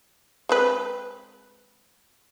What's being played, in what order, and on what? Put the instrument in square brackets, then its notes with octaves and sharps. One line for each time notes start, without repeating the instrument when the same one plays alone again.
[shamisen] G#3 C4 B4